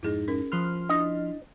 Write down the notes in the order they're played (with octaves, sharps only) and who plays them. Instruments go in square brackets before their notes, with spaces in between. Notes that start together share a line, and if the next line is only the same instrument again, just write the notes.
[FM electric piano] F2 G#2 D#4 [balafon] E4 G#4
[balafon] C#4 A#4
[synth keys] F3 C6 F6 [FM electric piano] B5 D#6 F#6
[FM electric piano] D4 E4 [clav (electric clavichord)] D#5